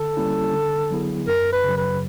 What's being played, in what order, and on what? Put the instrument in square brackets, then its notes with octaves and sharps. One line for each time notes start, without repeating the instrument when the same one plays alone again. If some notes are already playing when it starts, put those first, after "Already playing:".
Already playing: [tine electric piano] D3 [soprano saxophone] A4
[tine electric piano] G3 A#3 C#4 E4
D3
F#3 B3 E4 G#4
[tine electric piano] F#2 [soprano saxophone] A#4
[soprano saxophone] B4
[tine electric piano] C#3 F#3
[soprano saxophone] B4